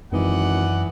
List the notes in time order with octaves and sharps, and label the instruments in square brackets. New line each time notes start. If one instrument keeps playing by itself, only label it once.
[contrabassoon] G#1 [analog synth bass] F#2 [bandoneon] E3 [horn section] D5 D#5 F#5